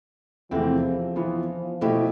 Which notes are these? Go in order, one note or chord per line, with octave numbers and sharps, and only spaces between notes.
E2 C3 E3 F3 A3 C4
E3 B3 F4
B2 A3 E4 G4